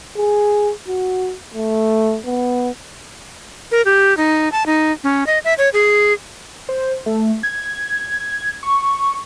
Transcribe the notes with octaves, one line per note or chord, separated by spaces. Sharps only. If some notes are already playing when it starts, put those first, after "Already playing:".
G#4
F#4
A3
B3
A#4
G4
D#4
A5
D#4
C#4
D#5
E5
C#5
G#4
C5
A3
G#6
C#6